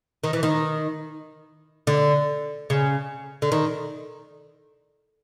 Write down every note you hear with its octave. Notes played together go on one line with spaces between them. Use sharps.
D#3
E3
D#3
D3
C#3
D3
D#3